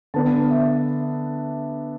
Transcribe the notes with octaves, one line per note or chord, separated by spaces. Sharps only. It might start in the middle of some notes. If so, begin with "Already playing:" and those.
D3 B3 D4 A5
E5